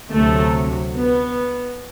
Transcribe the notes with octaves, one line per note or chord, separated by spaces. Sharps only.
D2 C3 F#3 A3
B3